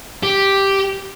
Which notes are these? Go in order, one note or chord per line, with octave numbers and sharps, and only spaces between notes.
G4